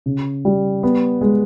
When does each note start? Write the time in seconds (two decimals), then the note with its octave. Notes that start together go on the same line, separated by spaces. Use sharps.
0.06 C#3
0.45 G3
0.83 B3
1.21 G#3